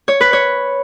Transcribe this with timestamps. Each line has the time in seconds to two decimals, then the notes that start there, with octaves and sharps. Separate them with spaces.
0.08 C#5
0.21 B4
0.33 C#5